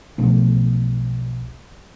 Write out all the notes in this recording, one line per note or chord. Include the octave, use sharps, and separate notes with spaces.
B1 B2 F3 A3